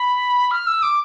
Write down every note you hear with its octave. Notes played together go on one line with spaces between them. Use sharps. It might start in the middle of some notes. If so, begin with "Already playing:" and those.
Already playing: B5
F6
E6
D6